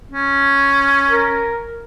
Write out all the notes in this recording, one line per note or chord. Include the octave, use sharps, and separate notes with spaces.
C#4
A#4